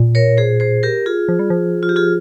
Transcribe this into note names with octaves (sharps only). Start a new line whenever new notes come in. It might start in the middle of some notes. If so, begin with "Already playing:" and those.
Already playing: A#2
A#4 C#5
G#4 C5
G#4 C5
G4 A#4
F4 G#4
F3
G3
F3
F4
G4
F4 G#4